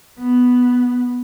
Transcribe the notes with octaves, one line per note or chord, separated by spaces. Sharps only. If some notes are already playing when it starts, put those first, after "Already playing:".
B3